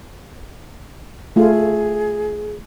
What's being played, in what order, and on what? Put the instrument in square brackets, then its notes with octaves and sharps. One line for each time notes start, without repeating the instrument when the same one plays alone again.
[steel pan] A3 F4 [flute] G#4